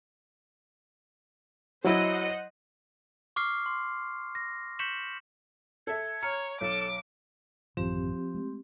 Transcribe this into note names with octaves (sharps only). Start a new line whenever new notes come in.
F#3 E4 C5 D#5 F#5
C#6 D6 F6 C7
C6
A#6
C#6 G6 B6 C#7 E7 F#7
A4 E5 G#6
C#5 A#5 F6 C#7
B1 A4 C#5 D6
A1 F#2 D#3 F3 C4 G4
G#3 A3